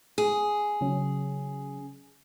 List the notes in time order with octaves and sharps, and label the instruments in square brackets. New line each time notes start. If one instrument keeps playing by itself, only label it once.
[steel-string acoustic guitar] G#4
[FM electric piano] C#3 F#3 C#4